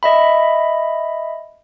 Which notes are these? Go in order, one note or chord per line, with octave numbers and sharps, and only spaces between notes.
D#5 E5 B5